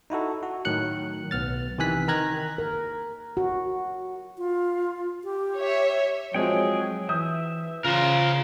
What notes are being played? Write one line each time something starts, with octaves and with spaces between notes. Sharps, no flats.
D#4 E4 F#4 A4
F#4
A2 D#3 F#3 F#6 C#7
B1 B3 F6 A6
C3 D#3 E3 G#5 F#6 B6
D#3 A#4 A#5 F#6 G#6 A#6
A#4
F#4
F4
G4
C#5 E5
F3 F#3 G#3 C4 G#4 G5
E3 E5 D#6 G6
C#3 F4 A#4 C5